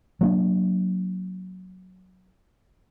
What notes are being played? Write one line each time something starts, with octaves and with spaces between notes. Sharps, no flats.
F#3 A#3 D4